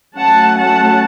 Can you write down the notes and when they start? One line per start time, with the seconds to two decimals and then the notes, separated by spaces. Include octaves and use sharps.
0.17 F#3 A3 C#4 F#5 A5
0.58 F#5 A5